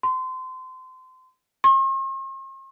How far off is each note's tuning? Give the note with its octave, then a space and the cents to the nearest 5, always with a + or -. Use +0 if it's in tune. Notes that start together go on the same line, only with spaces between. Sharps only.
C6 -25
C6 +45